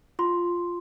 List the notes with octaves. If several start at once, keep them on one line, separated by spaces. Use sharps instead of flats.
F4 C6